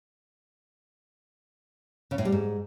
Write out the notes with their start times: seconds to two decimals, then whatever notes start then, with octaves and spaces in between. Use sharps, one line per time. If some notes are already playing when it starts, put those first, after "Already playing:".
2.11 C#3
2.18 A2
2.25 G3
2.32 G#2